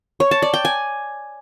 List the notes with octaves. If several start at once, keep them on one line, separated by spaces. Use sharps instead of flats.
C#5
A5
D5
G5
G#5